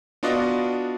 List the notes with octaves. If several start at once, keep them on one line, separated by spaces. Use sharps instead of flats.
B3 D4 F4 F#4 D5 D#5